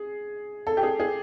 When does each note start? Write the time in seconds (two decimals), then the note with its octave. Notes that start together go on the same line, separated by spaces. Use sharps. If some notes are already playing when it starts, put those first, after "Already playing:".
Already playing: G#4
0.67 A4
0.77 G4
0.83 G#4
1.00 G#4